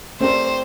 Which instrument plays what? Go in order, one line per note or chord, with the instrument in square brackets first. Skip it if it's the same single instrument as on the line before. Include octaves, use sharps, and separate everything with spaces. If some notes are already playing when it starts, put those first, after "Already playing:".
[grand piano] A3 C4 G4 A#4 D5 [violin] C5